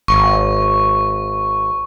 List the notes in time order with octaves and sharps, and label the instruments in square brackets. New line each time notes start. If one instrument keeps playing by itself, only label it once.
[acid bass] G#1 [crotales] C#6